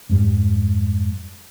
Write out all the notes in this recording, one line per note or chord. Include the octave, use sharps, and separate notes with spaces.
F2 G#2 G3